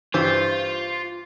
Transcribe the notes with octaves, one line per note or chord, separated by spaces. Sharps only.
G2 E3 F4 G4 C5